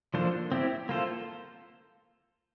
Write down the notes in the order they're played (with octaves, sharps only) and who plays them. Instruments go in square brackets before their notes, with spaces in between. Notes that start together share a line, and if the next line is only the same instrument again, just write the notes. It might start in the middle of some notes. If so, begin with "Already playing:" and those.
[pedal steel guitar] F3 A#3 D4 A4 C5
C4 E4 G4
A#3 F4 A4 C5